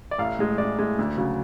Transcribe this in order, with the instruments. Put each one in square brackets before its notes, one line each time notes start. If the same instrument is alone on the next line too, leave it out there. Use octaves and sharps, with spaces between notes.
[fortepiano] D5
A1 F5
A2 G#3
A1 D5
A2 G#3
D2
C#3 F#3